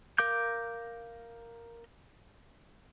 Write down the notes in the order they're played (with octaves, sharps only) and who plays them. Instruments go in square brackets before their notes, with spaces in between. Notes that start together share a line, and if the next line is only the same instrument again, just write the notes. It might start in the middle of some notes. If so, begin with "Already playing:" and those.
[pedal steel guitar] A#4 F5 D6 G6